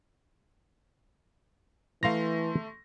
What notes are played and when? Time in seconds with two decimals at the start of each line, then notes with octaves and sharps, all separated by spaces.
2.03 E3 A3 F5 A#5 C6 A#6